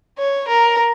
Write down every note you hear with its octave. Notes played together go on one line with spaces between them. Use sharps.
C#5
A#4